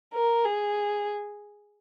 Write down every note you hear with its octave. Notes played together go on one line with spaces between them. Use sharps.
A#4
G#4